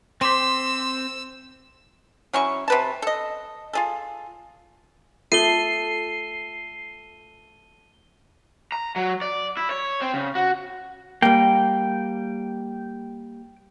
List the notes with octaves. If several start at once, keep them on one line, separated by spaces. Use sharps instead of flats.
C4 C5 C6 D6 E6 B6
F#3 C#4 E4 C#6
C3 B4 A5
A4 D#5
F4 G#4 A4
A3 F4 A4 C7 D#7 G7
A#5
F#3
D5
E4
C#5
C4
C#3
F#4
G3 A#3 G5